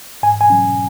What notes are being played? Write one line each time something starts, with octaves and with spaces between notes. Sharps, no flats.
G#2 G#5
G#5
F#3 C#4